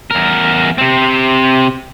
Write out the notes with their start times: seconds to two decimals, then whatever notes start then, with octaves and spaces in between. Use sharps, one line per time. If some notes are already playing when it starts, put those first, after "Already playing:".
0.11 E2 A#4
0.78 C3 C4